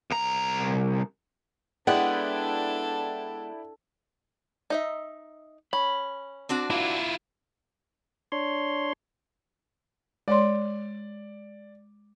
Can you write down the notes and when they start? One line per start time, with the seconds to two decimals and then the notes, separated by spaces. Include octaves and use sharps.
0.10 C2 A#5
1.87 G#3 B3 D4 E4 A4 D5 F#5 G5
4.70 D#4 D#5 E5
5.73 C#4 B5
6.49 C4 D4 F#4
6.70 A#3 E4 F4
8.32 D4 C#5 C6
10.28 G#3 C#5 D5 C6